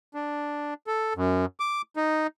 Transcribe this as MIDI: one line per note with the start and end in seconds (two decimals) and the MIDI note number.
0.14 0.74 62
0.87 1.13 69
1.16 1.45 42
1.60 1.82 86
1.96 2.27 63